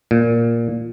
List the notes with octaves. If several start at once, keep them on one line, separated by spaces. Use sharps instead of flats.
A#2